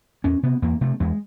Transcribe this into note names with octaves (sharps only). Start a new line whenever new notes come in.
E2 C#4
C3 B3
E2 A#3
C3 A3
E2 G#3